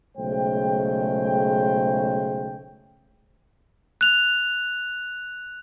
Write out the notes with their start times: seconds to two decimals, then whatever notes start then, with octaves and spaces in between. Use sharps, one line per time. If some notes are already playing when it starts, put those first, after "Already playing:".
0.17 B1 C#3 G#3 A3 C5 G5
4.01 F#6 F7